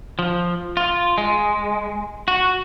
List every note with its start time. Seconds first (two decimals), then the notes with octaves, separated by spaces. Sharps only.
0.19 F3
0.77 F4
1.18 G#3
2.28 F#4